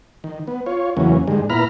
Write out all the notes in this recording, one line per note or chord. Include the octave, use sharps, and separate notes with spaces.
D#3
B3
F4 C#5
E2 C#3 E3 F#3 A#3 C#4
G#2 D3 D#3 G3 G#3
A#2 B3 E4 A#5 B5 F6